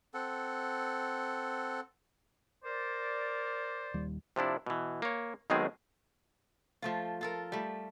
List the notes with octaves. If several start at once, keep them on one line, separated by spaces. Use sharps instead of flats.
C4 A4 F#5
A#4 C5 D5
D#1 D#2 G3
C3 F3 D4 E4
B2 E3
A#3 C#5
B1 B2 D#3 G#3 C4 G#4
F3 A3 F4
F4 A4 A#4
G3 A3